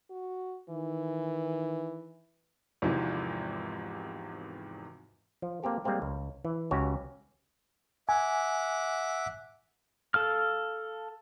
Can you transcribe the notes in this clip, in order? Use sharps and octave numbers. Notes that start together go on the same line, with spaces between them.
F#4
D#3 E3
G#1 E2 G#2 C3 E3 F3
F3
A#3 C4 G4 A4
G3 G#3 A#3 C4 G4
C#2
E3
C#2 C#4 F#4 G4 C#5
E5 F#5 G#5 D6
A4 F5 F6